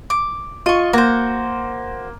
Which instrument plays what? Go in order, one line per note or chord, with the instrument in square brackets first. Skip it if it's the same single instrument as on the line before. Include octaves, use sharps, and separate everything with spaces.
[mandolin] D6
[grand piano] F4 [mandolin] D#5 C#6
[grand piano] A#3 [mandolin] F#4 C5